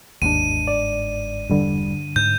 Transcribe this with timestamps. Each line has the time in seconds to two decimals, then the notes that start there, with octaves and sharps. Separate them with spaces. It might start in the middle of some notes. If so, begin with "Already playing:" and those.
0.22 G1 D#2 G#2 D4 D#7
0.68 D5
1.50 E1 G2 D3 G3
2.16 G#2 G6